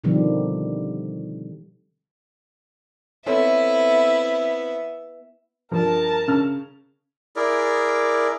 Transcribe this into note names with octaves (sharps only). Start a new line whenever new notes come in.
B2 D3 D#3 F3 G3 C4
B3 C4 E4 A4 C#5 E5
G2 F3 A#4 A5
C#3 F6
E4 G#4 A#4 D5